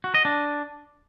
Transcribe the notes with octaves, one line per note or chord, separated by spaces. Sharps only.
F#4
D#5
D4